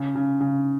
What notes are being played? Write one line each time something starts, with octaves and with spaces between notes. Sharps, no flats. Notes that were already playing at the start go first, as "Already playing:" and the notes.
Already playing: C#3
C#3
C#3